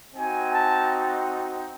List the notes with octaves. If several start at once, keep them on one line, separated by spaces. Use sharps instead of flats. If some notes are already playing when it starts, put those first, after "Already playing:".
C4 D#4 F#4 G#5
A5